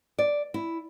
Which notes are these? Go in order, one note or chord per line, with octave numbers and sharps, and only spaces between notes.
D5
E4